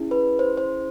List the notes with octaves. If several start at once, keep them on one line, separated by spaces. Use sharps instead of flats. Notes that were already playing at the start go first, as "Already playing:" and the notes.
Already playing: C#4 E4 G#4
B4
C5
C5